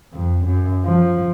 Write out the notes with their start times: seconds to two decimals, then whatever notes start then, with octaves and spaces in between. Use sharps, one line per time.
0.14 F2
0.46 F#2
0.85 F3